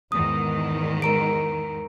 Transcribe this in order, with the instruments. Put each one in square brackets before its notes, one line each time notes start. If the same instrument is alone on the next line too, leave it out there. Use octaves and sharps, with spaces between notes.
[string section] E2 G#2 D#3 [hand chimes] D#6
[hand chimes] A#4 A#5 D7